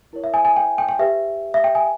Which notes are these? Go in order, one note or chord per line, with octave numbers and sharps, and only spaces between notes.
E4 A#4 C#5
E5
G#5
G#5
G5
G5
G5
G4 B4 E5
E5
G5
G#5